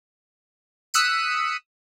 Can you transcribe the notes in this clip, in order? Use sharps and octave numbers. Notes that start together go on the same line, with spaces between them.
D#6 E6 F#6 B6 C#7 D#7